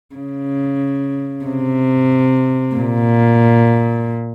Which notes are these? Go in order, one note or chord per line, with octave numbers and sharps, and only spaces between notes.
C#3
C3
A#2